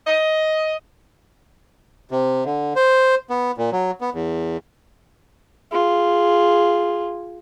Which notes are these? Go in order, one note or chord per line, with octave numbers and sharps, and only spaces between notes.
D#5
C3
D3
C5
B3
A#2
F#3
B3
E2
F4 G#4